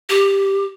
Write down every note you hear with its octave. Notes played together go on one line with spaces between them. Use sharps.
G4